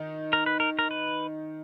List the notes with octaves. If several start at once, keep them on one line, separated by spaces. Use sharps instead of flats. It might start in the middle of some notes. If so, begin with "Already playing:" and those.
Already playing: D#3 D#4
A#4
B4
A#4
A#4
B4